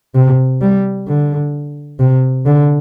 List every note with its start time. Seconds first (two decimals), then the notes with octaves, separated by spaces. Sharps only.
0.15 C3
0.61 G3
1.08 D3
1.99 C3
2.46 D3